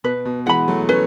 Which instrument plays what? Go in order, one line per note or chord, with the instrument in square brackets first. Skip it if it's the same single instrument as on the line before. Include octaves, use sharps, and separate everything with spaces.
[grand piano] B2 [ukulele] B4
[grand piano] B2
[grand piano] E3 G#3 [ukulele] F#5 B5
[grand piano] F#3 A3
[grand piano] A3 C#4 [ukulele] B4